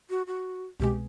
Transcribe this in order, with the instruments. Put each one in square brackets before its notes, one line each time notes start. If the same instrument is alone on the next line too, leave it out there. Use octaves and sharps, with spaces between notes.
[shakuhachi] F#4
F#4
[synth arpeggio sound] C2 B2 G#3 [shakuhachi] G4